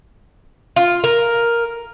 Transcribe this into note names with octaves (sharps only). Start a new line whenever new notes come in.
F4
A#4